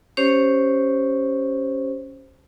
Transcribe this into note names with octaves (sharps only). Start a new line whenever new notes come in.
C#4 G4 C5 C#5